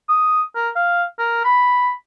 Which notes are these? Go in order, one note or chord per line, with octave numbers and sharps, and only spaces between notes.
D#6
A#4
F5
A#4
B5